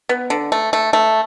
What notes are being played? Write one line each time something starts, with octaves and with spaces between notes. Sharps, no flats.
B3
D3
A3
A3
A3